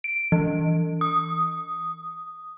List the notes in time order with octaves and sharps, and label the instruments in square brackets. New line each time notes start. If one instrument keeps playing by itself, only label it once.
[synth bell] D7
E3
D#6